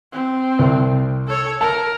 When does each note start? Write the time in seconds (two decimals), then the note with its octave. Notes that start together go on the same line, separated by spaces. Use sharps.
0.12 C4
0.59 C2
1.27 A4 C#5
1.61 A#4 A5